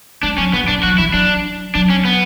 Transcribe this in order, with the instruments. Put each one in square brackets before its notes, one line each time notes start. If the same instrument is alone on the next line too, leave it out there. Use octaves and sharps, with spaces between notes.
[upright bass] G#3 [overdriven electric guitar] D4
[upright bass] F#3 [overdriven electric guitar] C#4
[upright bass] E3 [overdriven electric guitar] B3
[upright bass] F#3
[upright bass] E3 [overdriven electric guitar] D4
[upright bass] F#3 [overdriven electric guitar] F#4
[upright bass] E3 [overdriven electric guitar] E4
[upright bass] F#3 [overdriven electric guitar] D4
[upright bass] F#3 [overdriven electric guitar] D4
[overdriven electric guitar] C#4
B3